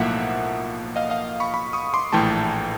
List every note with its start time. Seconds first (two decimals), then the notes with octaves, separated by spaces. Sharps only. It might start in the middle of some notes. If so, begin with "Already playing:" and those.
Already playing: B1 A2 F3 A#3 E5 F#5
0.96 D#5 F5
1.10 D#5 F5
1.40 B5 C#6
1.54 B5 C#6
1.73 C#6 D#6
1.94 C6 D6
2.13 A#1 A2 E3 A3 G5 A5